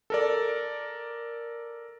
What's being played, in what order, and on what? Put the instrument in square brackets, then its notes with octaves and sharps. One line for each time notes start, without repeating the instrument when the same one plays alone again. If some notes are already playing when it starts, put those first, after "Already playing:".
[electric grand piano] A4 A#4 D5